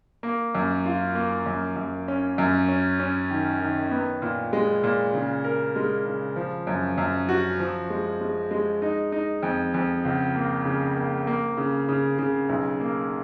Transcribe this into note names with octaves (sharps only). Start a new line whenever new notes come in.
A#3
F#2
F4
A#3
F#2
F#2
C#4
F#2
C#4
C#4
D#3
D#3
B3
A#2
G#3
A#2
C#3
A#4
G#3
C#3
F3
F#2
F#2
F#4
F3
G#3
G#3
G#3
D#4
D#4
F2
F2
C#2
A#3
C#3
A#3
A#3
C#3
C#3
C#3
B1
A#3